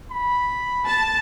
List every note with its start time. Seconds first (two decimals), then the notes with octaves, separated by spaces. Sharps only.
0.11 B5
0.86 A5